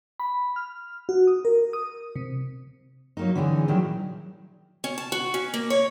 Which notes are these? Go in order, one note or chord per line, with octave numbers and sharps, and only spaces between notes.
B5
F6
F#4
D#6
A#4
D#6
C3
F#3 A#3 D#4
D3 E3 C#4 D#4 G4 G#4
A#2 D#3 F#3 G3 E4
C#4
A5
F#4
C#4
A#3
C#5